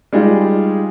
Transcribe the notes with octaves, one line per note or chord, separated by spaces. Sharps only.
G3 G#3 D#4 F4